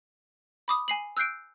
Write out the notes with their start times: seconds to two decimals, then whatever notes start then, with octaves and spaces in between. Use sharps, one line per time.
0.68 B5 D6 D#6
0.88 G#5 C7 F#7
1.17 E6 F#6 G6 C7 D7